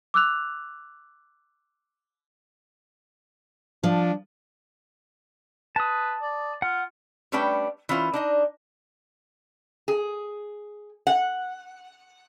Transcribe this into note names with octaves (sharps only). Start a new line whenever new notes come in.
D6 E6 F#6 F7
F3 D4
B4 A5 D#6
D5
F4 F#5
G3 A3 C#4 D4 B4 G5
E3 C#4 F4 C5
D4 D#4 D#5
G#4
F#5